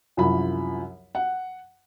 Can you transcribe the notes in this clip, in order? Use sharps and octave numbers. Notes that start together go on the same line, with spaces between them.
C2 F#2 F3 B5
F#5